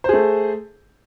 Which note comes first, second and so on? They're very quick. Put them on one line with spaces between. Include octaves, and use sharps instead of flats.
C5 G#4 A3